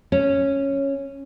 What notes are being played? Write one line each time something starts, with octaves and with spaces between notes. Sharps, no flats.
C#4